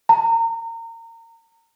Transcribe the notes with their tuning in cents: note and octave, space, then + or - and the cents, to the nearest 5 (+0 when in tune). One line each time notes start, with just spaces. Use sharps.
A#5 -30